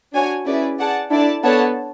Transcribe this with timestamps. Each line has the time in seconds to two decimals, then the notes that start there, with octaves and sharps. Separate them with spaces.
0.13 D4 F#4 C#5 G#5
0.46 C#4 E4 G#4 B4 D5
0.79 G#4 D5 F#5 A5
1.11 D4 E4 A4 D5 A5
1.44 B3 D4 A4 C#5 F#5 A5